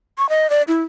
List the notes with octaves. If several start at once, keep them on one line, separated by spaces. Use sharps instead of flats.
C#6
D#5
D5
E4